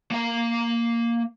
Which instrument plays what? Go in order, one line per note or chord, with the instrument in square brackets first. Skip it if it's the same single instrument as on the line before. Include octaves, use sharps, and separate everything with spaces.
[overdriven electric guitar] A#3 F5